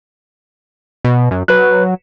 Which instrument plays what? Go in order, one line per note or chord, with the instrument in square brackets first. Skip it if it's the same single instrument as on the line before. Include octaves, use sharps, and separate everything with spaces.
[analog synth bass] B2
F#2
[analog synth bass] F#3 [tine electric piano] B4 F#6